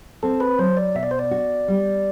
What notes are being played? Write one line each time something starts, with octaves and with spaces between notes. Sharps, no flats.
C4 A4
B4
F#3 C5
D5
B2 E5
D5
C5
D5
F#4
G3